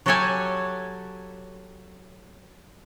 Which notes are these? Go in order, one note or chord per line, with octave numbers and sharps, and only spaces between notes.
F#3 F#4 G4 A4 C#5 G#5